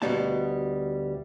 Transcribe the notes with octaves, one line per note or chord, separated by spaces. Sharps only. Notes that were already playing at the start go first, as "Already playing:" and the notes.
D2 B2 E3 G3 C4 A5